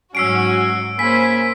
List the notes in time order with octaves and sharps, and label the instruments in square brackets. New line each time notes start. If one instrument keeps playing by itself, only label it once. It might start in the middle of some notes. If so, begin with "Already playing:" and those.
[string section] G#2 F#3 F#4 [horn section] C#4 [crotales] E6 C7 D7
[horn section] C#3 G#5 B5 [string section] A#3 C5 [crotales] B6